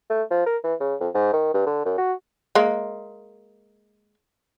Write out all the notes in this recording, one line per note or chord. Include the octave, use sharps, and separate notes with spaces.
A3
F3
A#4
E3
C#3
F2
G#2
D#3
G2
D3
F#2
F#4
G#3 A#3